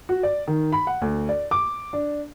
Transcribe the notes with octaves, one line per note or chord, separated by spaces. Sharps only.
F#4
D5
D#3
B5
F#5
D2
D5
D6
D4